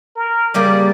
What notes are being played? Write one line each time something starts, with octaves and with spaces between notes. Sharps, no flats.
A#4
C#3 G3 A#3 D5